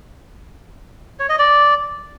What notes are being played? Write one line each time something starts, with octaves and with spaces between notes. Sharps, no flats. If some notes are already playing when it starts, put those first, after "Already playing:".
C#5
D#5
D5